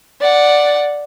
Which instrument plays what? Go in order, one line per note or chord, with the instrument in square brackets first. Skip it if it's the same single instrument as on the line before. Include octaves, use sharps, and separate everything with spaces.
[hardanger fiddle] D5 F#5